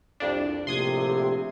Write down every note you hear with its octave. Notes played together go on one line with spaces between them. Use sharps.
C2 F2 D4
A#1 A2 C3 C6 D#6 G#6